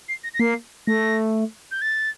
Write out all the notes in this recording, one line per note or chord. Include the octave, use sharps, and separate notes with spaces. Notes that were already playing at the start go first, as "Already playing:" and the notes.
C7
A#6
A#6
A#3 C7
A3 A#6
G6
A6